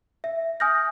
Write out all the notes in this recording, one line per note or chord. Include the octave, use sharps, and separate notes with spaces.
E5
G#5 D#6 F6 G6 A#6